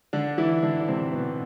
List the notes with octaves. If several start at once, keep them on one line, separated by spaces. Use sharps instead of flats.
D3 D4
E3 E4
D3 D4
D4
C3 C4
B2 B3